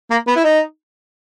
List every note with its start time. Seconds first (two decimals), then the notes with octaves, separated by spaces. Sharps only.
0.10 A#3
0.27 B3
0.36 E4
0.44 D#4